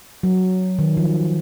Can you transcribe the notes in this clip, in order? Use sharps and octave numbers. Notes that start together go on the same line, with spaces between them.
F#3
D#3
F3